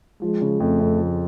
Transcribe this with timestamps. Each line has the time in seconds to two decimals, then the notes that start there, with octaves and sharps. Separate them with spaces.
0.22 F3 G#3
0.41 C#3
0.60 F2 A3
0.80 F2
0.98 F3